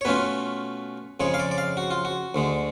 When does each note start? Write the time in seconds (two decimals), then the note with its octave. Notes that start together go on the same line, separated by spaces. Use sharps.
0.01 C#5
0.05 B2 A3 C#4 F4 B4
1.20 F2 C#3 G#3 C#5
1.34 F5
1.39 D5
1.51 D5
1.58 F5
1.77 F#4
1.91 F4
2.05 F#4
2.35 D2 D3 G#3